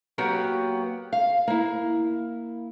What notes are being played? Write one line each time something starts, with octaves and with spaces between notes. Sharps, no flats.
F#3 A#3 B3 F#4 G4
F5
A#3 E4